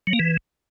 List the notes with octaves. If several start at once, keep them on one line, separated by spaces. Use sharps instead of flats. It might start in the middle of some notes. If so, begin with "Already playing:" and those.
F#3
A#3
E3